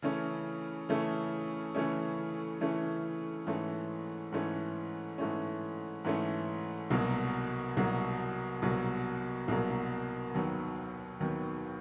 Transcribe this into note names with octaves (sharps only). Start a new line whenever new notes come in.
C#3 E3 A3 C#4
C#3 E3 A3 C#4
C#3 E3 A3 C#4
C#3 E3 A3 C#4
G#2 E3 A3 C#4
G#2 E3 A3 C#4
G#2 E3 A3 C#4
G#2 E3 A3 C#4
C2 B2 F#3 A#3
C2 B2 F#3 A#3
C2 B2 F#3 A#3
C2 B2 F#3 A#3
D#2 D#3 F#3 B3
D#2 D#3 F#3 B3